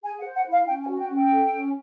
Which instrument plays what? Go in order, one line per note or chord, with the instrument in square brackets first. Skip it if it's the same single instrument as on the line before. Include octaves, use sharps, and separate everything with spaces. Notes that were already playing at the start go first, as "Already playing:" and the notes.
[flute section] G#4 G#5
F#5
C5
F#5
E4
F5
C#4 G5
G#5
F#4
G5
C#4
G5
A4
C#4